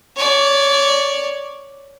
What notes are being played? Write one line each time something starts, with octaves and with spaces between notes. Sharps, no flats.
C#5 D5